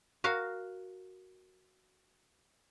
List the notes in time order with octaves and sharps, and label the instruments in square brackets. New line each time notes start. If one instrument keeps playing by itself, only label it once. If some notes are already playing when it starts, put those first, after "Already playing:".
[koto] F#4 A#4 F5